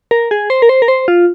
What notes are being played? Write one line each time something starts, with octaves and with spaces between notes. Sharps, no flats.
A#4
G#4
C5
A#4
C5
A#4
C5
F4